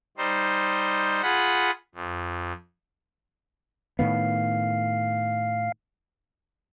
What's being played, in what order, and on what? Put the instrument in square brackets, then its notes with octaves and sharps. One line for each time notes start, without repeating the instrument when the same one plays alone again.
[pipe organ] G3 D#4 C5
F4 G#4 F#5 B5
F2
[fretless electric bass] A2 D#3 B3 [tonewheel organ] F5